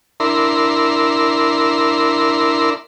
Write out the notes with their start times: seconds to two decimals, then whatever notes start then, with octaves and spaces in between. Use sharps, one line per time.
0.20 D4 E4 A#4 C6